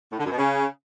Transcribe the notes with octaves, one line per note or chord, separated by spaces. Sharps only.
A2
D3
F#2
B2
C#3